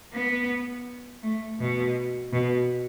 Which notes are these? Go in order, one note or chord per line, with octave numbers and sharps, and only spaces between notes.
B3
A3
B2
B2